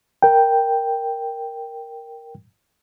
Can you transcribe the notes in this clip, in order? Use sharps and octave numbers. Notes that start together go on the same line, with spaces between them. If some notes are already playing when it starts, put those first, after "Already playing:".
A#4 G5